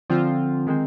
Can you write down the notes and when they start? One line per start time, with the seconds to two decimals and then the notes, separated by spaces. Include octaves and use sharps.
0.10 D3 F3 C4 F4
0.67 D#3 G#3 C4